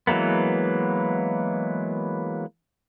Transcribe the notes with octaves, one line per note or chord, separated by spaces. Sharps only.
E3 F#3 G#3 A#3 B3